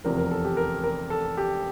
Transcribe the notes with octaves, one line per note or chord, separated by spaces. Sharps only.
F1 E2 C3 F3 A#4
A#4
A4
G4
A#4
A#4
A4
G4